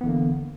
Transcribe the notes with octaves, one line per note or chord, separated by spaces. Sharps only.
D3 E3 A#3 B3